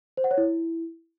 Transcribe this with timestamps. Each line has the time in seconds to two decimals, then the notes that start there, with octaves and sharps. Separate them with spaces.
0.17 C5
0.24 F#5
0.31 C#5
0.38 E4